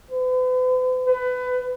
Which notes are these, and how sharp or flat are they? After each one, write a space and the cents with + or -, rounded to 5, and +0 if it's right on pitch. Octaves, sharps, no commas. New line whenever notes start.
B4 +45
B4 +25